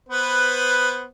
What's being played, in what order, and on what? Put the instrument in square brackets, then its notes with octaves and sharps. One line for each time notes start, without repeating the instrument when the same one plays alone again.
[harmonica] B3 B4 C5